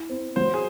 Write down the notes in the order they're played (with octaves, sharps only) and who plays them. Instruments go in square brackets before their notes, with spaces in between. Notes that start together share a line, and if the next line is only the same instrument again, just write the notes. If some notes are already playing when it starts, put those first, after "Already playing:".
Already playing: [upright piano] E4
C4
[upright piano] F#3 [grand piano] C5
[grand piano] G#4